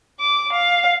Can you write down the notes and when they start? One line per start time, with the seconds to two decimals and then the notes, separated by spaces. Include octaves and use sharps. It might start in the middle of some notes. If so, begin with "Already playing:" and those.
0.20 D6
0.53 F5